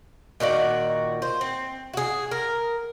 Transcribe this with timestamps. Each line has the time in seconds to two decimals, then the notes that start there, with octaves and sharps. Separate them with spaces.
0.40 A#2 D#3 F#4 D5
1.22 C5
1.41 C4
1.93 F#4 G#4
2.31 A#4